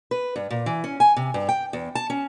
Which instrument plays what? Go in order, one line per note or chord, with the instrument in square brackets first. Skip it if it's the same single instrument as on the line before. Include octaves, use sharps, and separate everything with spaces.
[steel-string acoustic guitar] B4
G2
A#2
E3
C#4
G#5
C3
G2
G5
E2
A5
C#4